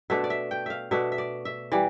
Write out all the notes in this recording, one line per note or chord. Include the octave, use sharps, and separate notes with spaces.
B2 A3 D4 E5
D5
E5
G5
E5 F5
B2 A3 D4 E5
E5
D5
E5
E3 G3 D5